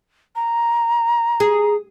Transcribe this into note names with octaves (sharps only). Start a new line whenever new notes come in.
A#5
G#4